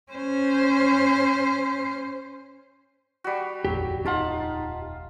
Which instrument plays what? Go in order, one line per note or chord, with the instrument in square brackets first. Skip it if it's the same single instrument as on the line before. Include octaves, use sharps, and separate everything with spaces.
[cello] C#4 C5
[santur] G3 F#4
[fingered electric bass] D#1 A#1 F2 [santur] F#3 [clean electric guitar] G4
[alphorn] D#4 [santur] F4 A5 [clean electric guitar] G4 F#5